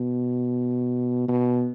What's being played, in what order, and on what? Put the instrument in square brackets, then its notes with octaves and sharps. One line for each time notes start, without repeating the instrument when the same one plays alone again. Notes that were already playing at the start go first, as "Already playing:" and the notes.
Already playing: [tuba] B2
B2